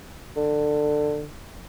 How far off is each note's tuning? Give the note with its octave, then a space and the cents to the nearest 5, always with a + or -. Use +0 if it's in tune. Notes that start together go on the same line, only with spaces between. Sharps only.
D3 +20